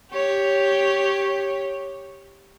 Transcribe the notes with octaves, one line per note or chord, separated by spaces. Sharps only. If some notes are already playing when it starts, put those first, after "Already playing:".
G4 C#5